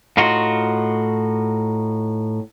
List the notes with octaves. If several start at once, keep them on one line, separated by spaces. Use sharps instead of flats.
A2 D#4 F4 F#4